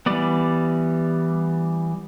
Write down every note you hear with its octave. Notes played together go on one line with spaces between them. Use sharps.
E3 G3 B3 D5